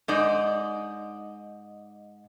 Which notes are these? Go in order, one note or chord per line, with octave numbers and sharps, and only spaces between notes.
G#2 D#4 D5